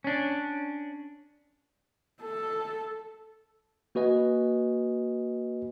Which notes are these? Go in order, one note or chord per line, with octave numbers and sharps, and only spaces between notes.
C#4 D4
A4
A#3 F#4 B4 D#5 G#5